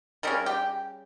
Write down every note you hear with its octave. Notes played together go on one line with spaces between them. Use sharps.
C#3 G3 C#4 A#4
G4